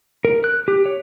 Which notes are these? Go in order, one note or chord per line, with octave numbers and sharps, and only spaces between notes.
A#4
F#6
G4
C#5